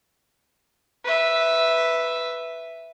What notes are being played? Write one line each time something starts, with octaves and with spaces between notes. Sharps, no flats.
B4 E5